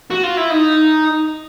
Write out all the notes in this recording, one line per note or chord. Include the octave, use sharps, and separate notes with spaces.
F#4
F4
E4
D#4